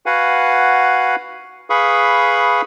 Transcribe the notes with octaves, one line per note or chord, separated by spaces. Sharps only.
F#4 B4 F5 F#5 G#5
G#4 B4 F5 B5 C#6 D#6